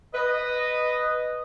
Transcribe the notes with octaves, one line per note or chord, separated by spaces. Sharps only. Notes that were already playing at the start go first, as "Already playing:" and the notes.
B4 D#5